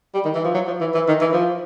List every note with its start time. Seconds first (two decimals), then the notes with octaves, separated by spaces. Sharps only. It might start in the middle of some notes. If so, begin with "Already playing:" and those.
0.14 G3
0.25 D#3
0.35 E3
0.45 F3
0.54 F#3
0.67 F3
0.80 E3
0.94 E3
1.08 D#3
1.21 E3
1.33 F3